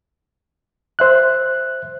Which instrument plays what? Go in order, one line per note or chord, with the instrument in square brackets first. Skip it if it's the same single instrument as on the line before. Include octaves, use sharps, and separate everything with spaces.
[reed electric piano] C5 E5 F#6